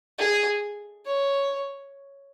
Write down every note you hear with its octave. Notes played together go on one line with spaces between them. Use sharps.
G#4
C#5